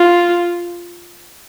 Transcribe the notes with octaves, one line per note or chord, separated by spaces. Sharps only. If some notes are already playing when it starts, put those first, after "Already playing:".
Already playing: F4